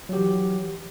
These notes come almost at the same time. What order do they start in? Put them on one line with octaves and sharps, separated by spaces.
F#3 G4 E3